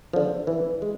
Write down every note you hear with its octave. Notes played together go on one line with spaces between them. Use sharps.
D3 F3
E3
G#3